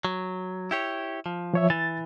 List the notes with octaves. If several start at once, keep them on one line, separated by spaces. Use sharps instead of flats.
F#3
E4 G4 C#5
F3
F3 C#5 E5
E3 A6